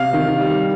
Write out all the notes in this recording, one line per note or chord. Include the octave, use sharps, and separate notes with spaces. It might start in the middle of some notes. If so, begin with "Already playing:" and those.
Already playing: C3 F5
D#3
G3